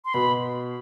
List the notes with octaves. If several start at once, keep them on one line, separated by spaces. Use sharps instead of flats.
C6
B2 B5